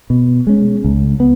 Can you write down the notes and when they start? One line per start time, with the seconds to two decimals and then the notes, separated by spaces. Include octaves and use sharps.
0.10 B2
0.47 G#3 C#4
0.84 C#2
1.20 B3